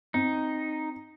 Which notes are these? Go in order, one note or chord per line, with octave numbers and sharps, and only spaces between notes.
C4 D#4